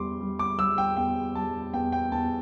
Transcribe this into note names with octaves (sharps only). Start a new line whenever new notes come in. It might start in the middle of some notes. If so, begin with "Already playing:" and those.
Already playing: E2 G3 C6 D6
G3
D6
G3 E6
G5
E2 G5
G3 A5
E2 G5
G5
E2 A5